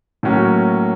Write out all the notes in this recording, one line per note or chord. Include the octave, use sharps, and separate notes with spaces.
A2 F#3 A#3 C#4 F#4